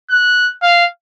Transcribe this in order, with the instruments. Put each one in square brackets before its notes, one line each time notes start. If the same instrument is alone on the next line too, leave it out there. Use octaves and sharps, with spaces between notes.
[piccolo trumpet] F#6
F5